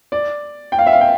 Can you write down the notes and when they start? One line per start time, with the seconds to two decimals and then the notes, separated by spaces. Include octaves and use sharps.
0.12 D5
0.72 G5
0.79 F5
0.87 E5
0.93 F5
1.01 G5